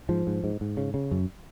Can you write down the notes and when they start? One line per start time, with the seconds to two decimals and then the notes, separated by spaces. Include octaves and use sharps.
0.09 G#2 F3
0.27 G#2
0.44 G#2
0.61 G#2
0.77 C#3
0.94 C#3
1.11 F#2